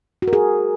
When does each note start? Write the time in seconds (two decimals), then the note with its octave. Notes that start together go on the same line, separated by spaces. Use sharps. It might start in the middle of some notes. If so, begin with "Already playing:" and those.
0.22 F#4
0.28 A#4
0.33 G#4